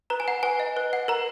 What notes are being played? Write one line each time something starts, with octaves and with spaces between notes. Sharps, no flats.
B4 A#5
G#5
F#5 A#5
B4 G#5
D#5
B4
F#5
A#4 A#5